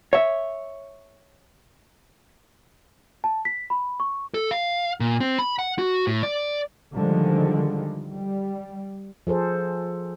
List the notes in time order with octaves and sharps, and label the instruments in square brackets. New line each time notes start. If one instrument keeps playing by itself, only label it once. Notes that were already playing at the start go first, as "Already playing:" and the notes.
[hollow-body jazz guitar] C#5 E5
[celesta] A5
B6
B5
C#6
[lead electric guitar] A4
F5
A#2
C4
B5
F#5
F#4
A2
D5
[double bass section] D3 D#3 F3 G3 G#3
G3
[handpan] F3 G#4 A4 C5